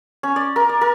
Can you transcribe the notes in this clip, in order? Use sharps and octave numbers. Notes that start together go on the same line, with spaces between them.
C#4
D5
A#4
D5
A#4